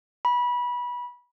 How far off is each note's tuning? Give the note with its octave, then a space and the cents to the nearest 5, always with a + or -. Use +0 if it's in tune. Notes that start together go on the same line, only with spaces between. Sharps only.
B5 -20